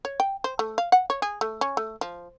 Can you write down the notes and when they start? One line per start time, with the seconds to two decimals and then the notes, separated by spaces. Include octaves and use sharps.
0.05 C#5
0.20 G5
0.44 C5
0.59 A3
0.78 F5
0.92 F#5
1.10 C#5
1.22 G#4
1.41 A3
1.61 C#4
1.77 A3
2.01 F3